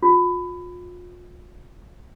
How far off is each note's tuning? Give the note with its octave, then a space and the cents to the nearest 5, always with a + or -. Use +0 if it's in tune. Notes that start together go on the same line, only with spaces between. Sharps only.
F4 +35